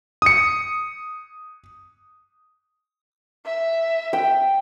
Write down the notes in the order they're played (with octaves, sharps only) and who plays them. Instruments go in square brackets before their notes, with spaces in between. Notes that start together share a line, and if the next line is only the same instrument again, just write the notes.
[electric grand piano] D#6 C#7
[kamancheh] E5
[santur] G5